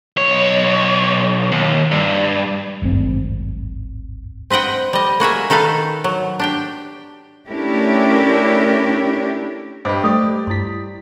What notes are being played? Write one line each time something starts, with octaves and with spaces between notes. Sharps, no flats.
B1 C#5
D#2
G2
D1 G#1 G2 C4
C4 B4 D#5 F#5 G5
G3 D#5
A#3 F#4 G#4 E5
D#3 D#4 A4 B4 F5
F#3
D4 G4 G5
A3 C#4 D4 E4 G4 A#4
G2 G4 C5 D#5 B5 D6
G3 A3 G4 D5 C#6 D#6
G2 E4 C6 B6